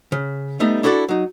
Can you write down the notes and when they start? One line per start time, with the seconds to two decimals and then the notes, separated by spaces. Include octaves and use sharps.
0.12 C#3
0.60 G3 A3 B3 D#4
0.83 D4 E4 F#4 A4 B4 D5
1.09 F#3 D#4